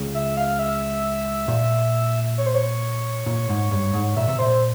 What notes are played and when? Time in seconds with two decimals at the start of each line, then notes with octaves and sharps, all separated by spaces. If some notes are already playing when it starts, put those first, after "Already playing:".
Already playing: C#2 C#3
0.15 E5
0.37 F5
0.59 E5
1.48 A#2
2.38 C#5
2.46 C5
2.55 C#5
3.26 A#2
3.49 G#2
3.71 G2
3.94 G#2
4.16 A#2 E5
4.28 C3
4.39 A#2 C5